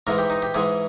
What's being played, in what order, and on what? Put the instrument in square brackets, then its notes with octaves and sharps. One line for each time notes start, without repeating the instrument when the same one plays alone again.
[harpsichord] G#2 E3 G#3 A#4
G4
D#4
G4
G#2 E3 G#3 G#4